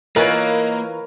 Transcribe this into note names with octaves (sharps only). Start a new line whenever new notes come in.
E3 A#3 F4 A#4 B4 C#5 D#5 G#6